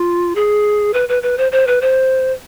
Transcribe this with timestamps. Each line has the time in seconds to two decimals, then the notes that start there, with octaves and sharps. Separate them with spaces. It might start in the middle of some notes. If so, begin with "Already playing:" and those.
Already playing: F4
0.35 G#4
0.93 B4
1.09 B4
1.23 B4
1.38 C5
1.52 C5
1.67 B4
1.81 C5